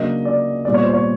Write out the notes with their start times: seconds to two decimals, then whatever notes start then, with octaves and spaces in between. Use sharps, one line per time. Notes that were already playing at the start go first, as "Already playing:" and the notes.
Already playing: C#3 F#3 A#3 D4 D#5
0.25 D5
0.65 A#2 G3 B3 D5
0.74 C#5
0.84 C5
0.94 C#5